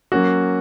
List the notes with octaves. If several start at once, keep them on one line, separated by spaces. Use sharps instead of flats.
F#3 A#3 C#4 F#4